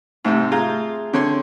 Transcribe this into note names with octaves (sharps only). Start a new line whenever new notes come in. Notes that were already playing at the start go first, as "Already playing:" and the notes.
G#2 C3 A3 C4 E5
F4 G#4 A#5 G6
D3 C4 C#5 C6